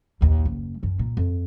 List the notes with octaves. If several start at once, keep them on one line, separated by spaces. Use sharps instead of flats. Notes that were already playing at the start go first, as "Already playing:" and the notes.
A#1 D#2
F#1
F#2 C#4
A#2
F2